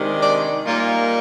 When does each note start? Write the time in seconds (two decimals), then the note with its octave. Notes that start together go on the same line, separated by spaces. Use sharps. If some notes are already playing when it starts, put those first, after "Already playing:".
Already playing: C3 D#3 G#3 D4
0.23 D5
0.64 A#2 G3 A#3 D#4 F4